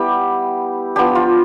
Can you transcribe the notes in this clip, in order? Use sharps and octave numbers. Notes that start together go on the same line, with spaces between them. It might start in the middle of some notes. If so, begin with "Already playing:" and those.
Already playing: G3 B3 E4 G4
F3 B3 D4 G4
F4